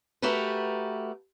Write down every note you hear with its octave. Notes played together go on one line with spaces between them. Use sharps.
A3 F#4 G4 A#4 B4